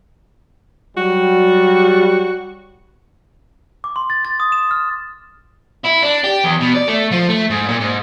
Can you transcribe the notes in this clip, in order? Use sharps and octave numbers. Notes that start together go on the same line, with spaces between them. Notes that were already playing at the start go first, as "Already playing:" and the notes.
F#3 G3 F#4
D6
C6
A6
A6
D#6
E7
F6
E4
D4
G4
E2
B2
D5
A3
F3
A3
G#2
A#2
G#2